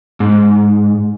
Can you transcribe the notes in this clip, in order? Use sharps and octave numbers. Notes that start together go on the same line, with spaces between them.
G#2